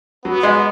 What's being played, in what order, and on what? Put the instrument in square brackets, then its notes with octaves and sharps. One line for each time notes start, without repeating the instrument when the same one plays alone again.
[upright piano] F#3 [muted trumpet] B3
[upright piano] G#3